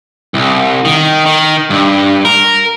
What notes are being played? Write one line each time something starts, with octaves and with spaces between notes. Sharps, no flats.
C2
D#3
D#3
G2
A#4